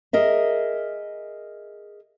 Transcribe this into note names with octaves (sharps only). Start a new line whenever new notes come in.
G#4 A#4 D#5 E5